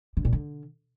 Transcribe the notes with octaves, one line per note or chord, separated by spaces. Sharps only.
D3
A#2
D3